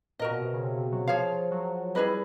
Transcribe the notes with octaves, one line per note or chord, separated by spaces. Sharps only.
A#2 F#4 A#4 D#5
B2
C3
C#3
C3
C3
F#3
F3 G#4 C#5 F5
F#3
G3 E4 G#4 B4 D#5